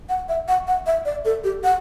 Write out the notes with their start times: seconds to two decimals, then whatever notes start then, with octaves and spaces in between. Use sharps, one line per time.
0.09 F#5
0.29 E5
0.48 F#5
0.67 F#5
0.86 E5
1.05 D5
1.25 A4
1.44 G4
1.64 F#5